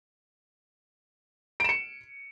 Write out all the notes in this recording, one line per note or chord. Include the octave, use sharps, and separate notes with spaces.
C#7 D7 E7